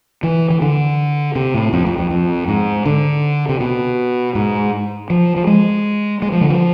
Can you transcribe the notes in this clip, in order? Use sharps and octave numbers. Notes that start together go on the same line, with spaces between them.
E3
E3
D3
C3
A2
F2
F2
F2
F2
G#2
D3
C3
B2
G#2
F3
F3
G#3
G#3
F3
D3
F3